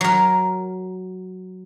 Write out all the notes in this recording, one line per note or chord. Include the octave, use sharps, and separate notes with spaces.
F#3 A#4